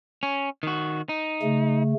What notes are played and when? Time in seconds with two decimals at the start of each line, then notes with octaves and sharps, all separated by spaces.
0.23 C#4
0.63 D#3 F#4
1.09 D#4
1.43 C#3 A3